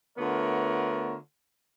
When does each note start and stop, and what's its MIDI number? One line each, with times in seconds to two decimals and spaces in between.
0.18 1.15 50
0.18 1.15 57
0.18 1.15 59
0.18 1.15 65
0.18 1.15 70
0.18 1.15 73